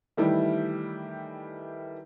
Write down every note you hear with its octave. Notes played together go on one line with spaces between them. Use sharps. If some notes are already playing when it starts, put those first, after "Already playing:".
D#3 E3 G3 A3 E4 G4